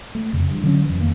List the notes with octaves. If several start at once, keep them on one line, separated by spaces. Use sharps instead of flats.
A3
F2 C#3
G2 E3
D3 F#3 C#4
F2 E3
F2 D#3 A#3